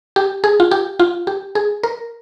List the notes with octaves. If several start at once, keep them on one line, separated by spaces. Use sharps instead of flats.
G4
G#4
F4
G4
F4
G4
G#4
A#4